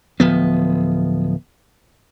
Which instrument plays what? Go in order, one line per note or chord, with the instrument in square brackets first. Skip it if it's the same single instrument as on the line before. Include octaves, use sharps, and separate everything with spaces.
[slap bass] D1 F3 B3